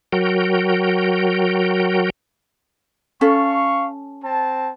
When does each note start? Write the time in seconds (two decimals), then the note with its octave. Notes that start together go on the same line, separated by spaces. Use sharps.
0.12 F#3 F#4 A#4 G5
3.21 C#4 A4 F5 C#6
4.24 C4 A5